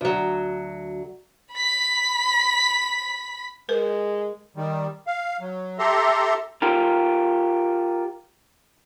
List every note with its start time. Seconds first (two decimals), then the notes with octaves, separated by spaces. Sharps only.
0.01 D2 F#3
1.53 B5 B6
3.69 G#3 A#4 B4
4.56 D#3 G3
5.07 F5
5.41 F#3
5.79 G4 A4 E5 A#5 C6
6.62 F4 G4 A#4